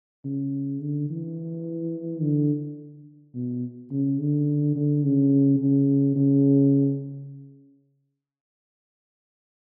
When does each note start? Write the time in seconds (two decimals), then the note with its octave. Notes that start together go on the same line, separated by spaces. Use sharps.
0.24 C#3
0.81 D3
1.10 E3
2.22 D3
3.35 B2
3.91 C#3
4.19 D3
4.75 D3
5.04 C#3
5.59 C#3
6.16 C#3